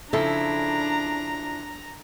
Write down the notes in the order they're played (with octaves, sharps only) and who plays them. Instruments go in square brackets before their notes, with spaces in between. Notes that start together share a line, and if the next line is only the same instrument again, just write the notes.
[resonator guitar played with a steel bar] C#3 F3 E4 [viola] D4 [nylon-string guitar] A4 [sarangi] A#5